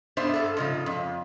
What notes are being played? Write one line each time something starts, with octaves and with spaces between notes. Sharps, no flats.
G2 B3 D4 C5 E5
G2 A4
G#2 C#3 F3
F2